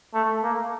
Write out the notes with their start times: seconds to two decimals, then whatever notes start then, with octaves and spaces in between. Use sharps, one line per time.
0.14 A3
0.43 A#3